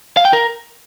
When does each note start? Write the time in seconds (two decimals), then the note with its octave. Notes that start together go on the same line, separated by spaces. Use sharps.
0.17 F5
0.25 G5
0.33 A#4